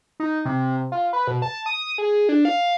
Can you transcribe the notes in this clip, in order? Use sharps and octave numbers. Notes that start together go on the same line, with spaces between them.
D#4
C3
F4
B4
B2
A5
D#6
G#4
D4
F5